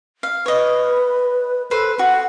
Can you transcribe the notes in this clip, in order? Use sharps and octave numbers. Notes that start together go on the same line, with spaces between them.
F5
B4 C#5 D#5
A4 B4 C5
F#4 F#5